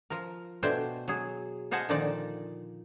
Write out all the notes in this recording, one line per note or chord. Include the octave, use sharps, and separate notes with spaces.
F3 A#4
B2 A3 D4 C5 G5 G#5
F#3 G#4
F4 C5 D#5 F#5 G#5 A5
A#2 D3 D#3 F3 D#4 D5